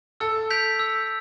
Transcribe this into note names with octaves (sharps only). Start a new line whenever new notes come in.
A4 E6
G6 B6 D7 F7
E6